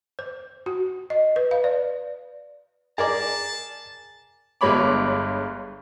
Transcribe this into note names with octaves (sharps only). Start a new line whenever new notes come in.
C5
F#4
D#5
B4
F5
D5
G#4 A#4 D5 A5
G1 G2 G#3 C#5 B5 D6